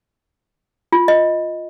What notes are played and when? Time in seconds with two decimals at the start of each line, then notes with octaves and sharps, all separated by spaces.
0.93 F4
1.08 D#5